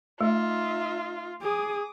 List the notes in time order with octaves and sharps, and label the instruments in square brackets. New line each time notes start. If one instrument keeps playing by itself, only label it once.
[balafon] A3 [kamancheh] D#4 E5 [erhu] F4
[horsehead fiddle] G#4 [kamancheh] D6 D#6